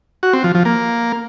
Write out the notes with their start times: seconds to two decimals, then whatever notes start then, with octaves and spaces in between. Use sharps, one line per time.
0.23 F#4
0.33 C4
0.44 F3
0.55 F3
0.65 A#3